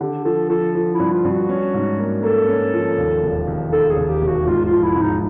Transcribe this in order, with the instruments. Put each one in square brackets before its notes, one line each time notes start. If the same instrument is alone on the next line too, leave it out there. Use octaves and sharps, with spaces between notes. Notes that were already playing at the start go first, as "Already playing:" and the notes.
[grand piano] D3 [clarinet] G4
[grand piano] F3 [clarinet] A4
[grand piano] F3 [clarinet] A4
[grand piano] F3
[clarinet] E4
[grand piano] G2
[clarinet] F4
[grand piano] G2
[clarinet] F#4
[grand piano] C#4
G#2
A#3
[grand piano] A#3 [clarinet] A4
[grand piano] C#4
F3
D#2
E1
D#2
[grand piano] D#3 [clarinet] A4
[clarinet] G#4
[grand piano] D#2
[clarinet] G4
[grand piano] E1
[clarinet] F#4
[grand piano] G#2 [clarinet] F4
[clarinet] F4
[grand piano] F3
[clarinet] E4
[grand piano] G#2
[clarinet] D#4